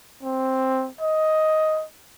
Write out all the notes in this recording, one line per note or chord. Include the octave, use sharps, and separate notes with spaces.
C4
D#5